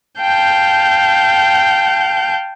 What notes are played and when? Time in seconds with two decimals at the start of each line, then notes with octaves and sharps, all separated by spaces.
0.21 F5 G5 A5 G6